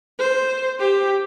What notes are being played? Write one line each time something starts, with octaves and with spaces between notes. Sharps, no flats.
C5
G4